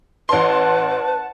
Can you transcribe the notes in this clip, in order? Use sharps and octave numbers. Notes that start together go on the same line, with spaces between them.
A1 B4 F#5 A5 C6